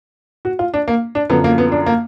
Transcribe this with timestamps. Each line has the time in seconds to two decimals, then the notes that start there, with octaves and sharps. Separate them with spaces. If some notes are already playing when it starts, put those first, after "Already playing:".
0.45 F#4
0.59 F4
0.74 D4
0.88 A#3
1.15 D4
1.30 F#2 D3 F3 B3
1.44 A#3
1.58 B3
1.72 D4
1.86 A#3